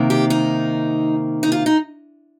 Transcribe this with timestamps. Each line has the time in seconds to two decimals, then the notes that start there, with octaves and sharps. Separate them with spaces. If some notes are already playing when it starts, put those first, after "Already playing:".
Already playing: C3 D#3 A#3
0.10 G4
0.30 D#4
1.43 D#4
1.52 F4
1.66 D#4